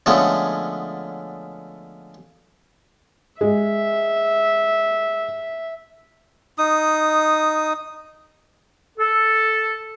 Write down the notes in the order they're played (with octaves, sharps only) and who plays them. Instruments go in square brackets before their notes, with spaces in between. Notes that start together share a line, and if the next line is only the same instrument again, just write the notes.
[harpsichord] D3 F3 G#3 A3 B3 C#4
[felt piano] G#3 [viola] E5
[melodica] D#4 D#6
[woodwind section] A4